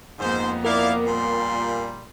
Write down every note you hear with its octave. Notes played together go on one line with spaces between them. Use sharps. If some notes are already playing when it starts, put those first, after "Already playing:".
F2 G#2 A#3 B3 C5
E4 A#4 D5 F5 D6
A#2 G3 C6